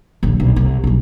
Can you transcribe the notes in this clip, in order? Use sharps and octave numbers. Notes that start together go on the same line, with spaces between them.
A#1 D#2
B1
C2
B1 F3